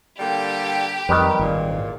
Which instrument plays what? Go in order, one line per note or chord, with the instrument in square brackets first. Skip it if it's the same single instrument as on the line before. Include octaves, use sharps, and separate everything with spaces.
[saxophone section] D3 G3 A#3 [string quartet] G4 G5
[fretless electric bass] F2 [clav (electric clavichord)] D#3 G3 B4
[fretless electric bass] G#1 [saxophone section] E2 A#2